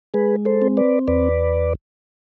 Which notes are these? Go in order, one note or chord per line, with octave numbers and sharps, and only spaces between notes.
G#3 G#4 B4
A4 C5
C4
B4 D5
E2 B4 D5